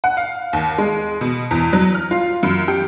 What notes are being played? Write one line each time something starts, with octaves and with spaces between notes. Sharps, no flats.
F#5
F5
D#2
G#3
B2
E2
F#3
F6
F4
F#2
G4